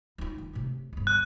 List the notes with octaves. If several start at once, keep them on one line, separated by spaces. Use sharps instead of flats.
D#4 F4
E3
A2 C3
G1 E2
F#6